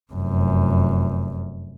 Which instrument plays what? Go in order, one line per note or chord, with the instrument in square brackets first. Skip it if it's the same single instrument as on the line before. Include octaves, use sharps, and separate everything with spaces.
[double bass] F1 F#2